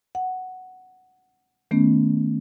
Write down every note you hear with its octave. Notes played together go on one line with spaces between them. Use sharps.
F#5
D#3 A3 B3 C#4